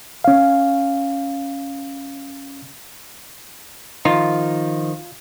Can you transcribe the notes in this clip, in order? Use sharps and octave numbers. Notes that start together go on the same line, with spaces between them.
C#4 F5
D#3 F3 D#4 F4